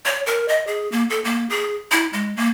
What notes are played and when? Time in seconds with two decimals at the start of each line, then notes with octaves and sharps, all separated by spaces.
0.05 C#5
0.26 A#4
0.48 D#5
0.67 G#4
0.92 A#3
1.10 A4
1.24 A#3
1.50 G#4
1.91 E4
2.13 G#3
2.37 A#3